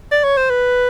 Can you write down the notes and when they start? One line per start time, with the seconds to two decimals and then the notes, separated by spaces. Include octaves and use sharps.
0.12 D5
0.24 C#5
0.37 C5
0.50 B4